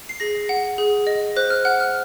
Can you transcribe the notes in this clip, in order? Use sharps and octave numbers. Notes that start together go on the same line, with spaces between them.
C7
G#4 A#6
F#5
G#4
D#5
C5 F#6
F6
F#5 F#6
F6